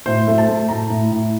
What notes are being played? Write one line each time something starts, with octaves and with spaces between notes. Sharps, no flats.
A2 C5
A3
A5
A3
A2 A#5
A2
A2